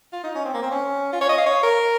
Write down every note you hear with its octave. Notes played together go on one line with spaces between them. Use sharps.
F4
D#4
C#4
C4
A#3
C4
C#4
F4
C#5
D#5
F5
C#5
A#4